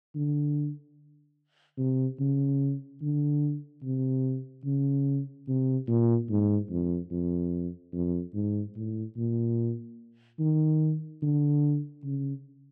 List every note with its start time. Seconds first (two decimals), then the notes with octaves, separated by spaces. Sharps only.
0.15 D3
1.78 C3
2.20 C#3
3.01 D3
3.83 C3
4.65 C#3
5.48 C3
5.88 A#2
6.30 G#2
6.70 F2
7.11 F2
7.93 F2
8.34 G#2
8.75 A2
9.16 A#2
10.39 D#3
11.22 D3
12.04 C#3